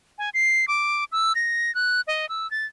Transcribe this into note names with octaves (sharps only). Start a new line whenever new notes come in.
G#5
C7
D6
E6
A#6
F#6
D#5
E6
A6